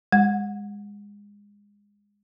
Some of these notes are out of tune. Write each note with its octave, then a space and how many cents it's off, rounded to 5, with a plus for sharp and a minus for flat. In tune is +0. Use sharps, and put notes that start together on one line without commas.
G#3 -25 F#5 -30